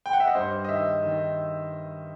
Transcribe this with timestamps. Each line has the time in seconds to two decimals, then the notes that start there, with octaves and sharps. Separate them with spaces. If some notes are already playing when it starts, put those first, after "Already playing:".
0.06 G5
0.13 F#5
0.20 E5
0.28 D#5
0.35 G2 C5
0.65 D#5
0.69 D#3 E5
1.03 D#3